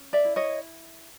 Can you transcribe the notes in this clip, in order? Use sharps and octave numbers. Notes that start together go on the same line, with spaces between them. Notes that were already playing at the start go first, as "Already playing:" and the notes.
Already playing: C#4
D5 E5
E4
C#5 D#5